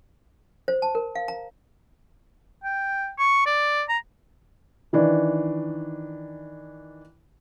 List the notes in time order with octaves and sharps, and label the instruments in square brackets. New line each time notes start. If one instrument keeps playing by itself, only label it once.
[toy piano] C5
A5
A#4
F5
A#5
[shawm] G5
C#6
D5
A#5
[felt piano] D#3 E3 D4